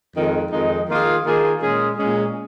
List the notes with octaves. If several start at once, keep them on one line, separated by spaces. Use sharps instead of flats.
F2 D#3 G#3 D#4
F2 D#3 G#3 D#4
D#3 A#3 F4 G#4
D#3 A#3 F4 G#4
A#2 G#3 C#4 G#4
A#2 G#3 C#4 G#4